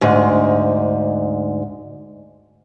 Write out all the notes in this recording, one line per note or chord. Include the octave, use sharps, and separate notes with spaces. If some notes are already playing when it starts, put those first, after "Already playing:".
D2 G#2